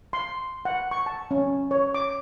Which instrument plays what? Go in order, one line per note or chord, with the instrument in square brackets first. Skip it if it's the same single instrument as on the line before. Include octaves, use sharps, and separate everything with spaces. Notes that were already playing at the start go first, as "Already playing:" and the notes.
[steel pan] C6
F#5
C#6
A5
C#4
C#5
D6